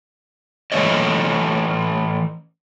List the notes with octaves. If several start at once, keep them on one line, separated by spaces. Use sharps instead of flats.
E3 A3 C#4 C#5 D#5